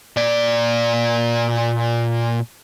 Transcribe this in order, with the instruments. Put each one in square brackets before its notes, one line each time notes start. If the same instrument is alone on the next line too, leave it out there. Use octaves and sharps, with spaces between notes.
[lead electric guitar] A#2 D5